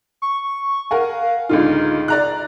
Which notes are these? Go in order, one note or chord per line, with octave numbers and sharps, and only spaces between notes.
C#6
A#4 F5 F#5 G#5
C#2 D3 D#4 F4
D5 A#5 F#6